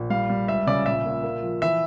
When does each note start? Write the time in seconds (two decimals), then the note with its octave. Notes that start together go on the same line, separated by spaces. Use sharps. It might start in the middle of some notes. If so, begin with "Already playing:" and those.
Already playing: A#1
0.10 G3 F5
0.30 G3
0.48 C#2 E5
0.67 C#3 D5
0.86 A#1 E5
1.06 A#2
1.23 A#3
1.43 F3
1.62 E3 E5